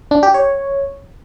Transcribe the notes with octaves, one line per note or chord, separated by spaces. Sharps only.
D4
G4
C#5